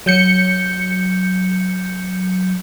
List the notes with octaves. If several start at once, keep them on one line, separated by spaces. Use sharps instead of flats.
F#3 G6 C#7